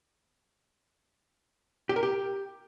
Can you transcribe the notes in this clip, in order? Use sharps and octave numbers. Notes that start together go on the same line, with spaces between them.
G4
A#4
G4